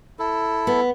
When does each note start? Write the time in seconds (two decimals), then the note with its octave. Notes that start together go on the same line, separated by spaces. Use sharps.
0.19 E4 A4
0.67 B3